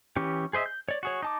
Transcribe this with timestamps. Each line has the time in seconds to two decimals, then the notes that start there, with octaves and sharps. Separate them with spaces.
0.16 E3 C#4 G4
0.53 G#4 C5 D#5 E5
0.66 G6
0.89 C#5 D5
1.03 F#4 G#4 C#5
1.22 D#4 A5 D6